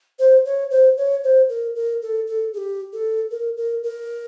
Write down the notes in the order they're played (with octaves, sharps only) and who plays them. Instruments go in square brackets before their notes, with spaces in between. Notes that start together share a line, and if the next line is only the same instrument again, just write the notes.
[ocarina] C5
C#5
C5
C#5
C5
A#4
A#4
A4
A4
G#4
G4
A4
A#4
A#4
A#4